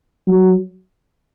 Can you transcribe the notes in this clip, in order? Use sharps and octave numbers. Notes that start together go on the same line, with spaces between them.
F#3